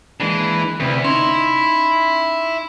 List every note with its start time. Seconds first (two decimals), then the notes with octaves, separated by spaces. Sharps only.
0.20 E3 G#3 A#3 D4
0.80 D2 C3 C4 B4
1.04 C#4 D#4 E4 C6